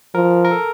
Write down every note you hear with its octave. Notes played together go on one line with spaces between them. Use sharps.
F3 A#4
A#4
A4